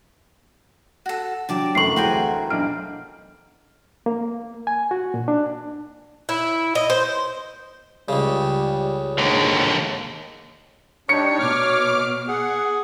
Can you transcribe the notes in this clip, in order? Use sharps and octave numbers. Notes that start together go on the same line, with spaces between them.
F#4 A4
D3 F#3 G4 D5 A5
F1 F#2 A2 A#3 A#4 C#6 C7 F#7
D2 E3 F#4 G#4 C5 G5 G#5
B1 D4 F6 D7
A#3
G#5
F#4
A#2
D4
E4
D#5
C5
C#2 C#3 G3
D#2 G#2 D3
G3 D4 D#4 C#5 C#7
B2 D6 F6
G#4 F#5